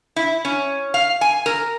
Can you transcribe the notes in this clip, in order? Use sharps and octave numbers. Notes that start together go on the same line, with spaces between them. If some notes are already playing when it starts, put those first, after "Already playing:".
E4
C#4
F5
G#5
A#4